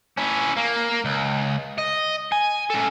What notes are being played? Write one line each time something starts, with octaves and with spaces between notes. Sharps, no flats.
C#4 E4
A#3
C#2
D#5
G#5
C#4 A4